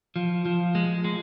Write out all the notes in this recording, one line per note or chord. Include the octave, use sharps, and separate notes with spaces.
F3
F3
G#3
G#3